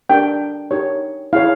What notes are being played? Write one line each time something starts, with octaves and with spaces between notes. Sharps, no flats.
D4 G4 A#4 G5
D#4 G4 A#4 C#5
E4 G#4 C#5 F5